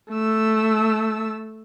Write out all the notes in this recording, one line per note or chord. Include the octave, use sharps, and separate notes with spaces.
A3 E6